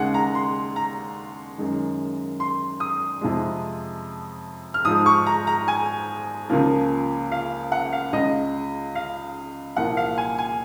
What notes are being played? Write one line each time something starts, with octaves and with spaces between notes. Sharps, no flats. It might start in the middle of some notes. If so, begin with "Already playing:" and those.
Already playing: D#2 C#3 G#3 F#5
A#5
C6
A#5
F#2 D#3 G#3
C6
D#6
F2 C3 F3 G#3
F6
G#2 F3 G#3 D#6
C#6
A#5
A#5
G#5
C#2 C#3 F3 A#3
F5
F#5
F5
C#2 C#3 G#3 D#5
F5
C2 A#2 F3 A#3 F#5
F5
G#5
G#5